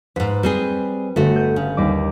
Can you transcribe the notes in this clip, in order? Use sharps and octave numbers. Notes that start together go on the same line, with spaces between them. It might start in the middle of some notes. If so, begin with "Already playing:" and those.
F2 G#2 B4
G3 C4 G#4
G1 A3 F#4
G6 D#7
C#3
D#2 G3 D6